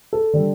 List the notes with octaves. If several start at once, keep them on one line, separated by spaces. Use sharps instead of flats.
A4
D3 G3